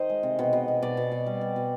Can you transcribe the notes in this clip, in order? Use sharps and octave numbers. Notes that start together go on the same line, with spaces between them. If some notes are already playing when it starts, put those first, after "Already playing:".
Already playing: D#3 C5 D#5
G#3
C3
B2
B2
B2
B2 D5
B2
B2
G3
G3
B2